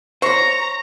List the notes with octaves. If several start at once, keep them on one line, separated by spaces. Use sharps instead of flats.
C5 C#5 A#5 C#6